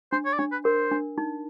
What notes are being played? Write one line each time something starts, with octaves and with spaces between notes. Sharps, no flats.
D4 C5
C#5
D5
D4 C#5
B4
A#4 C5
D4
D#4